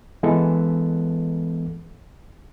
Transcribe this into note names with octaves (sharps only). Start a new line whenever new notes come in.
E3 G#3 B3 A4